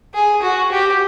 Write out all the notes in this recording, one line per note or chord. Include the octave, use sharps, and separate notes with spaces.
G#4
F#4
G4